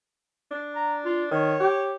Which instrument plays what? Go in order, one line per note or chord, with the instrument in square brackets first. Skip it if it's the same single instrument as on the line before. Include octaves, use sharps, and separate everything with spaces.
[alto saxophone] D4
[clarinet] A#5
F4
[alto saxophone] D#3 [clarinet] C#5
[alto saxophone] G4